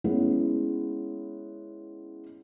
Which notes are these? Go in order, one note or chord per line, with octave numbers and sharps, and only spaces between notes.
G#3 B3 C#4 E4